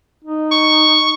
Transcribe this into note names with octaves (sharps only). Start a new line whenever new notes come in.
D#4
C#6